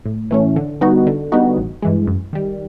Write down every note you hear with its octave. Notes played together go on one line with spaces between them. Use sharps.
A2
E3 A3 C#4
D3
G3 B3 D#4 F#4
D3
G3 B3 D#4 F#4
A1
G2 E3 G#3
F#2
D#3 G3